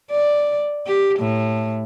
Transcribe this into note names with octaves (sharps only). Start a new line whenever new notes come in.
D5
G4
A2